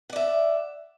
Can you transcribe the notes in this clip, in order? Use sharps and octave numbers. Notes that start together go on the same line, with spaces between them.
D5 E5 F#5